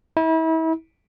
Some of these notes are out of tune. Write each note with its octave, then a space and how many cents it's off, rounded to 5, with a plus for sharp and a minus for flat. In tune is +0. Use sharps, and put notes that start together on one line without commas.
E4 -35